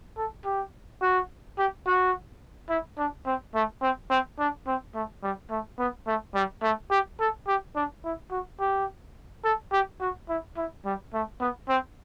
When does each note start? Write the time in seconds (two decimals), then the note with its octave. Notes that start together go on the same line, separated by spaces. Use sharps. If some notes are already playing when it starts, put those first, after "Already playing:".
0.17 A4
0.45 G4
1.02 F#4
1.58 G4
1.86 F#4
2.70 E4
2.98 D4
3.26 C4
3.54 A3
3.82 C4
4.10 C4
4.39 D4
4.67 C4
4.94 A3
5.23 G3
5.50 A3
5.79 B3
6.07 A3
6.35 G3
6.63 A3
6.91 G4
7.20 A4
7.47 G4
7.76 D4
8.04 E4
8.31 F#4
8.60 G4
9.44 A4
9.72 G4
10.01 F#4
10.29 E4
10.57 E4
10.85 G3
11.14 A3
11.40 B3
11.69 C4